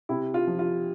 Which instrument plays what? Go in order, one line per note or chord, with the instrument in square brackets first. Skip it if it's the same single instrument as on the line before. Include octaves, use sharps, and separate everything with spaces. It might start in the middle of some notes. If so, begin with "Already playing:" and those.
[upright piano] C3 E4
F4
F3
F4